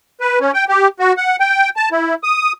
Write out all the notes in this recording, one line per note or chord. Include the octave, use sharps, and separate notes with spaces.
B4
C#4
G5
G4
F#4
F#5
G5
A5
E4
D#6